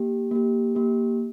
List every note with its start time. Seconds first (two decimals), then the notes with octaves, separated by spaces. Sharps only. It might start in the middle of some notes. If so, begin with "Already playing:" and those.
Already playing: A#3 G4
0.31 A#3 G4
0.75 A#3 G4